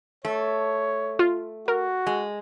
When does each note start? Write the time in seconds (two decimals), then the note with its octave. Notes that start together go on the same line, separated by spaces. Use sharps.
0.25 A3 C#5
1.19 F4
1.68 F#4 A#4
2.07 G#3